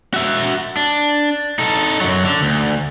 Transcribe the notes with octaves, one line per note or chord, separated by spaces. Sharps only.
F#4 E5
D4
D#4 A4
F#2 F#3
D3
D2